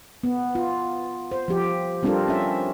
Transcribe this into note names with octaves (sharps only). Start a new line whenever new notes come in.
B3
F4
C5
F3 G4
G3 C4 D4 F4 A4 A#4
C#4 E5